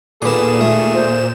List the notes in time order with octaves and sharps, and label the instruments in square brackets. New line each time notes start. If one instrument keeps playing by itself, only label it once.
[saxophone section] D#2 G#4 A4 [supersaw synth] A#2 E7 [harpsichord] B3 D6
[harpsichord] A3
[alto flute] C5